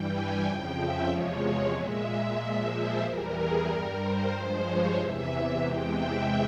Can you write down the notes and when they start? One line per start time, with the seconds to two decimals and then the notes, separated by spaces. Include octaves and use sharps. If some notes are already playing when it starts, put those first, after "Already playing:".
Already playing: G2 E3 G3 G5
0.11 G#5
0.44 F2 C#3 F3 G5
0.76 E5
1.08 E2 C3 F3 G#3 C#5
1.74 A#2 G#3 E5
2.38 A#2 F3 G#3
2.70 C5
3.02 E2 E3 G3 A#4
3.35 G#4
3.67 G2 G3 A#4
4.00 C5
4.32 G2 F3 G#3 C5
4.64 C#5
4.97 E2 C3 E3 E5
5.29 E5
5.61 E2 C3 E3 G#3 G5
5.93 E5